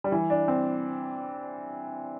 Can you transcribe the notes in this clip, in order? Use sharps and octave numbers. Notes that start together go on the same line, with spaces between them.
G3
E3
D4
C4